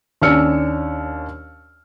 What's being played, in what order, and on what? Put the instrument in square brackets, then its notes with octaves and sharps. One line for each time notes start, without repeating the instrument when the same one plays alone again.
[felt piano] D#2 C#4 D4 E6 F6 C#7